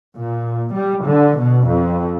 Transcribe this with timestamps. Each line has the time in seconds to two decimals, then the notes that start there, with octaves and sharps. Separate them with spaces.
0.16 A#2
0.74 G3
1.06 D3
1.39 B2
1.69 F2